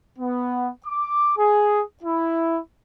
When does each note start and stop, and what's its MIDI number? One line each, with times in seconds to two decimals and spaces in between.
0.18 0.69 59
0.86 1.32 86
1.37 1.82 68
2.03 2.58 64